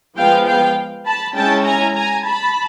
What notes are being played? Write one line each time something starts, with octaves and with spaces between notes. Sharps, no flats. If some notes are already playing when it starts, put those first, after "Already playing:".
F3 G#3 B3 F5 G5
F5 G5
A5 B5
G#3 C#4 E4 G5 A5
G#5 A#5
G#5 A#5
A5 B5